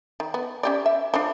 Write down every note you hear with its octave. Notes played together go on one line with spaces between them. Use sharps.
D#3
B3
C#4 G4 D5
E5
F3 D4